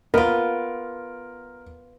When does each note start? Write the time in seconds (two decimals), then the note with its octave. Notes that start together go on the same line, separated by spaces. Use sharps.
0.14 B3 F4 A#4